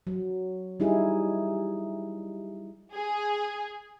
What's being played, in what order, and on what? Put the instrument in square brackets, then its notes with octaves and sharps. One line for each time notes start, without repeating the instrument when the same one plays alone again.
[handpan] F#3
G3 D#4 E4 G#4
[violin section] G#4